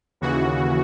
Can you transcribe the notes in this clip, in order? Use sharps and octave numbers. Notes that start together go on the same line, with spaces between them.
D#2 C#3 E3 F#4